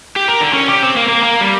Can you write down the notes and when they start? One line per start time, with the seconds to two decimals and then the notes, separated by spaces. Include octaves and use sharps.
0.16 G4
0.28 A#4
0.41 D3
0.53 C#4
0.68 G4
0.83 C4
0.97 A#3
1.08 A#3
1.23 A#3
1.41 G3